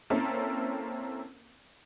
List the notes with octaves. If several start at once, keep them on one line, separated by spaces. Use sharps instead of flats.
A#3 C4 C#4 E4 A4 A#4